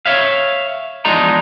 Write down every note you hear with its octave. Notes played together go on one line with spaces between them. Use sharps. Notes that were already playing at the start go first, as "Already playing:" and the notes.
C#5 E5 F5
E2 F3 G#3 D4 D#4 A#5